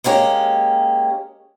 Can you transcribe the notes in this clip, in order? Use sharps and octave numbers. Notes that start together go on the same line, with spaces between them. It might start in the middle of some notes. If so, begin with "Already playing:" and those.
G#3 A#3 C#4 G4